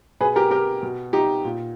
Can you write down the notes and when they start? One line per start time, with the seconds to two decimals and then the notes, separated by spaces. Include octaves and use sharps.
0.20 B2 G#4 B4
0.36 G4 A#4
0.51 G4 A#4
0.83 B2
1.13 D#4 G4
1.45 A#2